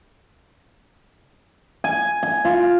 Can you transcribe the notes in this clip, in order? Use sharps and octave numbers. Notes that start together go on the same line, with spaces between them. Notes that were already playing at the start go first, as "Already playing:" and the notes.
G#5
G#5
F4